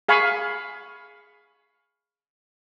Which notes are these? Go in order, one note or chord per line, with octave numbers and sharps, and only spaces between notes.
G#4 F5 G#5 B5 C#6